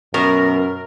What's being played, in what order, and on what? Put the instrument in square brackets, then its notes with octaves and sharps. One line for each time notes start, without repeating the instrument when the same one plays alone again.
[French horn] F#2 [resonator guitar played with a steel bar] B2 [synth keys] A#4